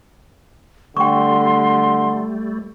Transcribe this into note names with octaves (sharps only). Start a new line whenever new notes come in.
D3 G3 A3 G5 C6 C#6